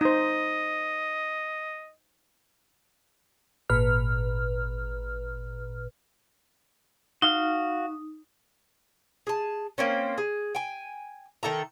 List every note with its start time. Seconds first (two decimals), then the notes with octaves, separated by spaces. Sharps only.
0.01 D#4 C5 D#5
3.70 G#1 A#2 B4 F6
7.22 D#4 F#4 F5 F6
9.27 G#4 A5
9.78 A#3 C4 C#4
10.18 G#4
10.55 G5 G#5
11.43 D#3 A4 E5 A#5